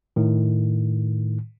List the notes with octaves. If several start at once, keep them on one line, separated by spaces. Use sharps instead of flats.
A2 D#3